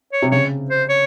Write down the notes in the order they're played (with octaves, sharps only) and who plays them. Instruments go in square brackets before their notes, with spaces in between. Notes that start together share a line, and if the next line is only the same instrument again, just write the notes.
[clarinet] C#5
[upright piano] C3
[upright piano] C#3 [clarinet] C#5
[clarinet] C5
C#5